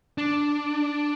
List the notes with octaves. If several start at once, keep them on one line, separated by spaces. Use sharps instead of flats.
D4